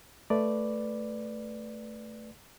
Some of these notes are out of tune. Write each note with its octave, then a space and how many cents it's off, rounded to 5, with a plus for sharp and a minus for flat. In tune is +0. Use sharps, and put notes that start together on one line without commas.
A3 +0 B4 +0 D5 +0